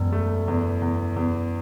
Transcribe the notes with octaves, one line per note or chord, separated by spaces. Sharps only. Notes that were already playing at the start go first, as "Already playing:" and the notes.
Already playing: E1 F#2
A3
E2
E2
E2